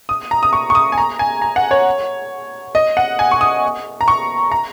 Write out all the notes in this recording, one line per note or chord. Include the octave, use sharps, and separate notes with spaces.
D#6
A#5
D#6
C#6
C#6
D#6
G#5
A#5
G#5
A#5
F#5
C#5
D#5
F#5
G#5
C#6
D#6
A#5
C#6
A#5